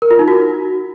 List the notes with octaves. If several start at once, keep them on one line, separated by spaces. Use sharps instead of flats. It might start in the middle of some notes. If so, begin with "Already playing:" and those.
A#4
F4
D#4
F#4